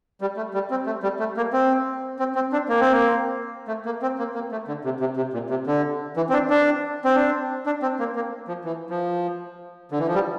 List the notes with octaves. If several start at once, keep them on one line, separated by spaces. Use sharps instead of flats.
G3
A3
G3
C4
A3
G3
A3
A#3
C4
C4
C4
D4
A#3
C4
A#3
A3
A#3
C4
A#3
A#3
A3
D3
C3
C3
C3
A#2
C3
D3
E3
C4
D4
D4
C4
D4
D4
C4
A#3
A#3
F3
E3
F3
D3
E3
F3
G3